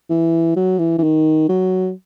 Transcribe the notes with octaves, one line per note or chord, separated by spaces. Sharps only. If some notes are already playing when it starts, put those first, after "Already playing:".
E3
F#3
E3
E3
D#3
F#3